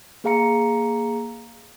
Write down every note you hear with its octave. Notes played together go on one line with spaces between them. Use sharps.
A#3 G#4 F5 A#5 C#7